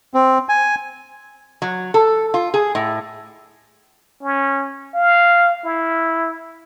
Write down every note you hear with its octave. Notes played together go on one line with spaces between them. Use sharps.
C4
G#5
F#3
A4
F4
G#4
A2
C#4
F5
E4